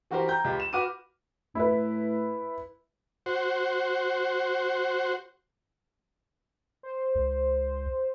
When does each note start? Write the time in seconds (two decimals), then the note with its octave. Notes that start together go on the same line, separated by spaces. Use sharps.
0.11 E3 F#4 G4 A#4 C5
0.28 G5 A#5 G6
0.44 C#2 G4
0.60 E7
0.73 F#4 B4 D6 F6 D#7
1.55 A2 E4 B4
3.26 F#4 C5
6.83 C5
7.15 C#2